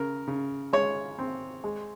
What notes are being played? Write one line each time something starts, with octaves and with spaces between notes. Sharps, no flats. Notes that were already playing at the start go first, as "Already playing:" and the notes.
Already playing: C#3 A#4
C#3
G#3 C#5
C4
G#3